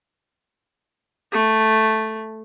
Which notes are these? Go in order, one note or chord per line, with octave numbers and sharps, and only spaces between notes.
A3